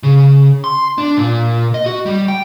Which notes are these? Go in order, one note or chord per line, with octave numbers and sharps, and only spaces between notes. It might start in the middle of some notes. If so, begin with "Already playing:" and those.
C#3
C6
D4
A#2
D#5
F#4
G3
G5